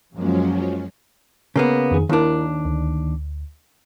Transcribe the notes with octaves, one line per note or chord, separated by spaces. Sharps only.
F#2 F3 F#3 G#3 A#3 C#4
C#3 A#3 B3
F2 D#3 G#4
D#2 D#3 D4 E4 A#4
D2